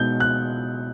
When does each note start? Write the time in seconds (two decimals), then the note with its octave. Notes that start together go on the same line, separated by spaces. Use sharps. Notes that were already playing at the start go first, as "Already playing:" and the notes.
Already playing: B2 G#3 B3 D#4 G6
0.20 F#6